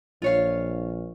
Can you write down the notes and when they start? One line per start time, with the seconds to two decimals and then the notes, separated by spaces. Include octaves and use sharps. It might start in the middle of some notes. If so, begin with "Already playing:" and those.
0.22 A#1 F4 C#5 F5